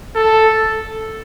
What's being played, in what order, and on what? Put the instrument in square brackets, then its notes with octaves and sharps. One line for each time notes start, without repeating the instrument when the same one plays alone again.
[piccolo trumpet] A4